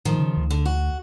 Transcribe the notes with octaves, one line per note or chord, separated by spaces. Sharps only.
A2 D#3 F3
C#3
D2
D3
F#4